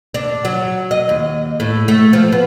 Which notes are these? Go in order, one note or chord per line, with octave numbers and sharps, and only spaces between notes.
D4
F#3
D#5
D#2
A2
A3
F3
B3